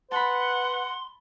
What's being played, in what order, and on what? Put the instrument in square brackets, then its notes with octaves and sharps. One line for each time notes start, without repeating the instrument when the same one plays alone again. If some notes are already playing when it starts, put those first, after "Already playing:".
[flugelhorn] B4 [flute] F#5 [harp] A5 B5 [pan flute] C6